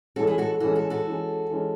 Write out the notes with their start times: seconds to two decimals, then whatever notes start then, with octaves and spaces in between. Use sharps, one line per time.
0.16 E3 G#3 C#4 F#4 A4
0.27 E4 G#4
0.38 F#4 A4
0.60 E3 G#3 C#4 F#4 A4
0.76 F#4 A4
0.90 F#4 A4
1.06 E3 G#3 C#4
1.50 E3 G#3 C#4